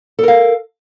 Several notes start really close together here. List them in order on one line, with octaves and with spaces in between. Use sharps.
A4 A#4 F5